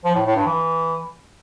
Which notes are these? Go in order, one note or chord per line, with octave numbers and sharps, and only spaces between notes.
F3
A2
A2
G2
E3